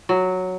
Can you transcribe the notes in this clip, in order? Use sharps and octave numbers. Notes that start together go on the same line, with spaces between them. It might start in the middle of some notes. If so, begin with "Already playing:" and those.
F#3